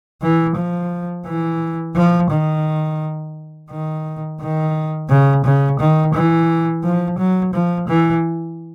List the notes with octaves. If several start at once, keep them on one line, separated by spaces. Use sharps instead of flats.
E3
F3
E3
F3
D#3
D#3
D#3
C#3
C#3
D#3
E3
F3
F#3
F3
E3